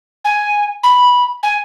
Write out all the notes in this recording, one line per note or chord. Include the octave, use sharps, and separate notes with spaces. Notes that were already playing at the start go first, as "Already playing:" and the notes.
G#5
B5
G#5